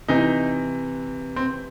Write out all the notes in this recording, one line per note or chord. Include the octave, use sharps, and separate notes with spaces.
C3 E3 D#4
C4